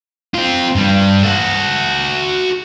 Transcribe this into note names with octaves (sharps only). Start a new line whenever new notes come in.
C4 F4
G2 G3
F#4 A4